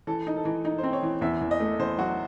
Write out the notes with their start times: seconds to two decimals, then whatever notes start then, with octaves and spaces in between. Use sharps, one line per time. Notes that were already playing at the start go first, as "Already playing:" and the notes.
0.07 E3 A4
0.27 D#4
0.37 A4
0.45 E3
0.65 D#4
0.78 C5
0.83 C4
0.93 C#5
1.03 E3
1.21 E2 E5
1.41 E2
1.51 D#5
1.60 A3
1.79 E2 C5
1.98 F#3 F#4